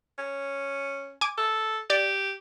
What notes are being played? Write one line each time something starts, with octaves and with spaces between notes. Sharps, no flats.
C#4
G#5 D6
A4
G4 D5